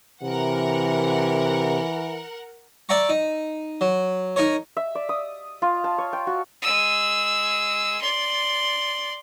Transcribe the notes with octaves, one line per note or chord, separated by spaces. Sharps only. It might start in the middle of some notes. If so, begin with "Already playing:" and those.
C3 E3 A#4 F#5
D5 E5 G5 A#5 C#6
D#4
F#3
D#4 A#4 C#5
E5
D5
D#6
F4
A5
C#5
G5
F#4
G#3 E6
D5 C6